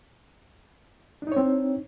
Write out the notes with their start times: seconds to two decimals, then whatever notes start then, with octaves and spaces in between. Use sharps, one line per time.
1.22 D4
1.27 D#4
1.32 C#5
1.36 C4